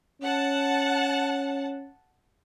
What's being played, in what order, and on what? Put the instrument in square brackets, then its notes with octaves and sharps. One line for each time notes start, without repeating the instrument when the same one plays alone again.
[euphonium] C#4 [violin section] F#5 A5